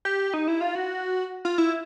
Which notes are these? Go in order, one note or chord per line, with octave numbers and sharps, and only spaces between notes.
G4
D#4
E4
F4
F#4
F4
E4